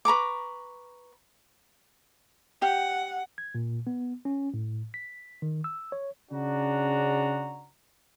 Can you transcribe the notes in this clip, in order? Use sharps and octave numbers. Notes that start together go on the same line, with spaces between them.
B4 A#5 C#6 D6
G4 F#5
G#6
A#2
B3
C#4
A2
B6
D#3
E6
C#5
C#3 C#4 D4 F#4 A#5